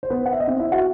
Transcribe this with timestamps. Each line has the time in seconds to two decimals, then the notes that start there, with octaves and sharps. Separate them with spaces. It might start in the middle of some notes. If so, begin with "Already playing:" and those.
0.03 C5
0.10 B3 B4
0.26 F#5
0.33 E5
0.40 D#5
0.48 C4 C5
0.60 E4 E5
0.72 F#4 F#5